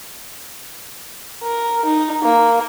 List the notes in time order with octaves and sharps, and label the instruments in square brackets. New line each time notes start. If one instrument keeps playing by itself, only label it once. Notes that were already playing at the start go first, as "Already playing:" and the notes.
[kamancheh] A#4
D#4
A#3